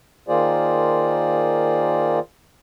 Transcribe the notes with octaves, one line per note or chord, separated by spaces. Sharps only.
D#3 A#3 F4 G#4 C5 D5